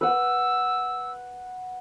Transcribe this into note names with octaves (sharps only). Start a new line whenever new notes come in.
B4 F#5 E6